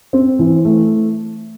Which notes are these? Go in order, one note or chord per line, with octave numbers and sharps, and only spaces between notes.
C4
E3
A3